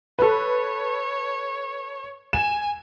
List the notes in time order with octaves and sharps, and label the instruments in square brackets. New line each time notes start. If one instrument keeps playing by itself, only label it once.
[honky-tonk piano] A4 B4 [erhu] C#5
[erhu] G#5 [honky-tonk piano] E7